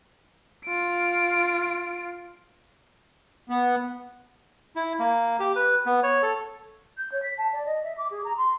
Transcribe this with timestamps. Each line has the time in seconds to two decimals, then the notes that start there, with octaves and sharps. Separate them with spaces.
0.65 F4 D7
3.50 B3
4.76 E4
4.99 A#3
5.40 G4
5.56 B4
5.86 B3
6.03 C#5
6.23 A4
6.97 G6
7.11 C#5
7.23 B6
7.37 A5
7.52 D5
7.66 D#5
7.84 E5
7.97 D6
8.10 G#4
8.24 A#5
8.37 C6